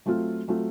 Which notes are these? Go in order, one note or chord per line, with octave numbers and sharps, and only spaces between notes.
F#3 A3 C4 F4
F#3 A3 C4 F4